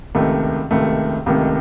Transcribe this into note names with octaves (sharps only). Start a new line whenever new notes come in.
C#2 C3 D#3 A3
C#2 C3 D#3 A3
C#2 C3 D#3 A3